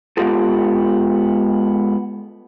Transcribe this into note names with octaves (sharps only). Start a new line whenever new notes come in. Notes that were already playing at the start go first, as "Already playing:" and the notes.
G#3 B3 F4 G4 A4